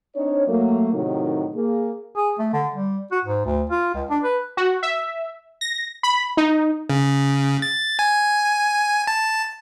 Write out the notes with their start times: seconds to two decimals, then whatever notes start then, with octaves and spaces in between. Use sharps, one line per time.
0.16 C4 D4 D#4 C#5
0.48 F#3 A3 A#3
0.93 A2 C3 D#3 F#3 D#4
1.55 A#3 G#4
2.16 G#4
2.39 A3
2.53 D3
2.74 G3
3.12 F#4
3.25 G#2
3.45 D2
3.70 F4
3.94 C#2
4.10 D4
4.23 B4
4.57 F#4
4.83 E5
5.61 A#6
6.03 B5
6.37 D#4
6.90 C#3
7.62 A6
7.99 G#5
9.07 A5